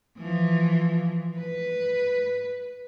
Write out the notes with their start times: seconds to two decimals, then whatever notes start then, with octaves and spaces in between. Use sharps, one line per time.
0.18 E3 F3
1.38 B4